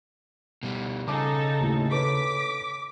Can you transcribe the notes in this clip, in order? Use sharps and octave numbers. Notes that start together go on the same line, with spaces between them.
B2 G3
C#3 D#4 A4 G#5 D6
D#2 A2
A4 B4 C#5 D6 B6